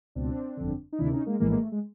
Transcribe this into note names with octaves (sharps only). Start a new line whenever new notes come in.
C#2 B2 C4 D4
G1 F2 D3
D#4
D2 C3 D#3 D4 E4
C#4 D#4
G#3 A#3
A#1 A2 E3 G#3 A#3
G#3 A#3
A3
G#3